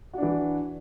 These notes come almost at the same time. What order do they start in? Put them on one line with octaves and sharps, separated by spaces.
F#4 D4 E3